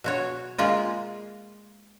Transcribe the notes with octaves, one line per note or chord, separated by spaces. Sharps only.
B2 F#4 C#5
G#3 A#3 F4 D#5